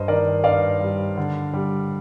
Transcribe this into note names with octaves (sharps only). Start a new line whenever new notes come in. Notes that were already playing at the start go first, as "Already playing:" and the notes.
Already playing: G2 C5 D#5
D#3 A#4 D5
G2 D5 F5
G3
D3
G3